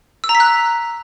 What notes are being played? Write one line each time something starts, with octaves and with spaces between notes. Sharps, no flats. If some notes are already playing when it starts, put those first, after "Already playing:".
E6
A#5
B6
F#6